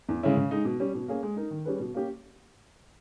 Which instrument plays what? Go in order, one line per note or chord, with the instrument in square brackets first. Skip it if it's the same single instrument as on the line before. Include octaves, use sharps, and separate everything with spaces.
[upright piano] E2
C#3 G#3 C#4 E4
C#3
G#3 D#4
B2
G3 C#4
B2
A#3 C#4 G#4
G#3
D#4 A#4
D#3
G3 C#4 G#4 B4
B2
A#3 C#4 G4